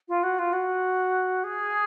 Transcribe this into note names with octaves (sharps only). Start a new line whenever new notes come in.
F4
F#4
F4
F#4
G#4